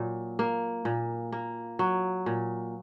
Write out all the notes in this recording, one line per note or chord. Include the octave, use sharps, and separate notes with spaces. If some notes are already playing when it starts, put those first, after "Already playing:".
Already playing: A#2 F#3
A#3
A#2
A#3
F#3
A#2